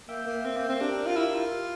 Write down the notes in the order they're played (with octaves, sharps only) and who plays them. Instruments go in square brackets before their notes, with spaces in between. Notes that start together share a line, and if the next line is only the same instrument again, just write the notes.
[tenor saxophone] A#3 [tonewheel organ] E5 G5
[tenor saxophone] A#3
C4
A#3
C4
[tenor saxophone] D4 [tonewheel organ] G4 A#4
[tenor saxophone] F4
E4
F4